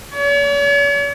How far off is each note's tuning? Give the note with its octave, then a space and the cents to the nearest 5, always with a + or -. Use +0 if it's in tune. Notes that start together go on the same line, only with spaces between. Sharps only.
C#5 +45